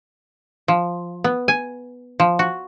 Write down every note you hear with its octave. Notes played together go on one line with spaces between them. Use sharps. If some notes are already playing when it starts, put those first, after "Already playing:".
F3
B3
G#5
F3
F#4